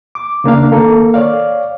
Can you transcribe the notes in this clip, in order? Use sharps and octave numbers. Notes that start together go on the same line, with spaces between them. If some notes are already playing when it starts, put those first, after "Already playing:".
D6
C#3 A#3 D4 F5
D#3 A#3 A4
C#5 D5 F5